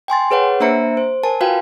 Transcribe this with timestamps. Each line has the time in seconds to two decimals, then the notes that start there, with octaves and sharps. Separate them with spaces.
0.08 G5 G#5 C6 A6
0.31 G#4 B4 C#5 F#5
0.60 A#3 D4 C5 E5 A#5 C#7
0.97 C5
1.23 A#4 G#5 A5
1.41 F4 F#4 B4 F5 G5